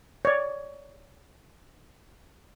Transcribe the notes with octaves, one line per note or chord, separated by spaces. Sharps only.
C#5 D5